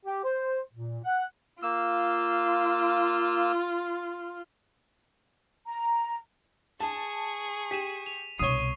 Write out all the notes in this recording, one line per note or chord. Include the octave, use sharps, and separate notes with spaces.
G4
C5
A#2
F#5
A#3 F4 E6
A#5
G#4 A5 C#6
G4 B6 D#7 E7
F7
C2 B2 C#5 C#6 D#6 C7 D#7